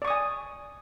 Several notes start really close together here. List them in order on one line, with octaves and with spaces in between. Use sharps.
D5 C#6 D#6 G#5